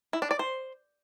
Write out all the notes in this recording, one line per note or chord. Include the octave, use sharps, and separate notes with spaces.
E4
D4
D5
C5